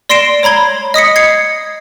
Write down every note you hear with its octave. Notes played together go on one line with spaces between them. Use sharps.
D5 C6 A#6 C7 D7 E7
C#5 A#5 B5 G#6 G7
D#5 D#6 B6 C#7
G#6 C7 C#7